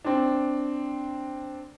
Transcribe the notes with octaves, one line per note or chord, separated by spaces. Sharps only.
C4 D4